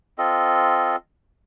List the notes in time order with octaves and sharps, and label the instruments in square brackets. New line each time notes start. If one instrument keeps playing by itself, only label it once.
[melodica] C4 F4 A4 D#5